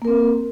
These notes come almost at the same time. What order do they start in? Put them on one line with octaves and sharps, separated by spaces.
A#3 A#4 C4